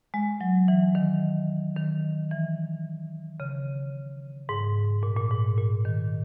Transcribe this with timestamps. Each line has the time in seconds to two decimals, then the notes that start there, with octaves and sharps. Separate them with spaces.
0.14 G#3
0.41 F#3
0.68 E3
0.95 D#3
1.77 D#3
2.31 E3
3.40 C#3
4.49 G#2
5.03 A#2
5.17 A#2
5.31 G#2
5.58 A#2
5.85 D#3